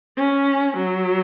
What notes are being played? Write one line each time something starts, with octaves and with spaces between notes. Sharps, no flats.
C#4
F#3